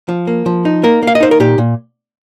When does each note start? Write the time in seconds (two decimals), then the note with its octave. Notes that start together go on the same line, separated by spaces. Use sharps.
0.09 F3
0.27 A#3
0.46 F3
0.65 D#4
0.83 A#3 A#4
1.03 A#3 F5
1.15 D#5
1.20 D#4 C5
1.31 A#4
1.40 A#2 G4
1.58 A#2